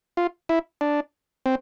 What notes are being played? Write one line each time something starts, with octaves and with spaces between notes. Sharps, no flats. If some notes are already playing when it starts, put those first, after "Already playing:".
F4
E4
D4
C4